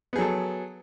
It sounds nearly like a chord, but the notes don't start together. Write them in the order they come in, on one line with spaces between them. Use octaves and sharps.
B3 G#4 F#3 A4